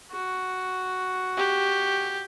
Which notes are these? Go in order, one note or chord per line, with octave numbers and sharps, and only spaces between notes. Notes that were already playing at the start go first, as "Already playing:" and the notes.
F#4
G4